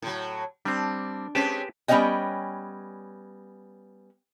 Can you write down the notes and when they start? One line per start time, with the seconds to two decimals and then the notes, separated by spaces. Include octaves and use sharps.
0.02 A2 F#3
0.65 G3 C4 D4
1.35 G#3 C4 C#4 G4 B4 A5
1.88 G3 B3 C#4 C#5 D#5 G5